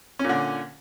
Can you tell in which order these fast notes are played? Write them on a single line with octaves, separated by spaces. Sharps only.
C#4 A#2 D3